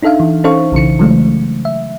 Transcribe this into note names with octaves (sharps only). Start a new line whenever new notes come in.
D4 D#4 A4 E5 F5
E3
C#4 D#4 A4 C5 F5 C#6
B1 C#3 E3 C#7
C#3 E3 F#3 G#3 A3
E5